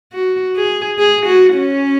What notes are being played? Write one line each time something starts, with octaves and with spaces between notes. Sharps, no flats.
F#4
G#4
G#4
F#4
C#4